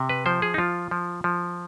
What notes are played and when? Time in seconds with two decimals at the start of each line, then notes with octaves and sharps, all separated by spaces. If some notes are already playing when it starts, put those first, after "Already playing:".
Already playing: C3
0.09 B4
0.26 F3 C5
0.42 G#4
0.54 D#4
0.58 F3 F4
0.91 F3
1.24 F3